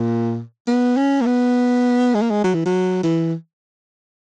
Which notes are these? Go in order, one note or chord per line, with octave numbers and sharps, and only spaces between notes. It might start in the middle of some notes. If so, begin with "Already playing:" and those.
Already playing: A#2
B3
C#4
A#3
B3
G#3
A#3
G#3
F#3
E3
F#3
E3